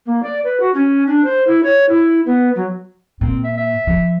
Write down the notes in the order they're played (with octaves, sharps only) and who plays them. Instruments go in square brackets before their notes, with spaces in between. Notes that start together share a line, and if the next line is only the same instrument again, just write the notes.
[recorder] A#3
D5
B4
F#4
C#4
D4
C5
E4
C#5
E4
B3
F#3
[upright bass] A#2 [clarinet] C4
[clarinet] E5
E5
[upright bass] F3